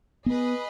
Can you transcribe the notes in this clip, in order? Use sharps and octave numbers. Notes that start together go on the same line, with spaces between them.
B3 G#4 B4 D#5